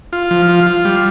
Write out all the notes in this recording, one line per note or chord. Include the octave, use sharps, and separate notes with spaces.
F4
F3
F4
F4
G3